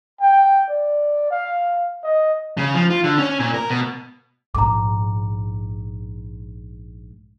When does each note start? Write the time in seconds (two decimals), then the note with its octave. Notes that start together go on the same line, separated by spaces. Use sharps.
0.21 G5
0.69 D5
1.31 F5
2.04 D#5
2.57 C#3
2.75 F3
2.90 F4
3.04 D3
3.18 C#4
3.39 A#2
3.54 A#4
3.70 B2
4.55 A#1 G#2 A#5 D6